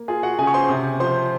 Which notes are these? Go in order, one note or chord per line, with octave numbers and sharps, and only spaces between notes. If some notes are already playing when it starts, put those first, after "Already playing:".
Already playing: A#3
F4 G#4
F#4 F#5
C#3 G#4 G#5
C#6
C5 C6
C3
F3 C5 C6